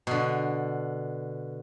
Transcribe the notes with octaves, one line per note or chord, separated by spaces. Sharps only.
B2 D3